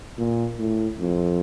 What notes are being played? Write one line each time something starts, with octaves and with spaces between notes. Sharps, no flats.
A#2
A2
F2